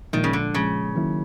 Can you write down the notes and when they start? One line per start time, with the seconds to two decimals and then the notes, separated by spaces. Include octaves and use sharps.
0.13 A#2 D#3 F3 G#3
0.24 C#3
0.33 D3
0.54 A#2 C#3 F3 G#3
0.95 D#3 F#3 A#3 C#4 E4